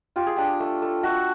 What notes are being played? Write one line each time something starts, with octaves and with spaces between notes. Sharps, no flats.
F4 G4
G#4
D4 G4
A3
A3
A3 F#4